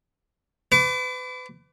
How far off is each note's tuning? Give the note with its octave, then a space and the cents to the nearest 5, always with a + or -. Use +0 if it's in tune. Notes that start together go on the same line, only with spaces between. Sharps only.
B4 +35 D6 -25